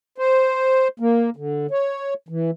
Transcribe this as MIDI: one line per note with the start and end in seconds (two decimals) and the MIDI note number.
0.18 0.88 72
1.00 1.30 58
1.37 1.67 50
1.71 2.14 73
2.29 2.51 52